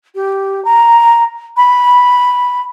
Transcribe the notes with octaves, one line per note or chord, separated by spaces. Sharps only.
G4
A#5
B5